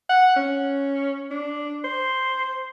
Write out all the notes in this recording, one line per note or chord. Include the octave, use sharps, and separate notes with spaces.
F#5
C#4
D4
C5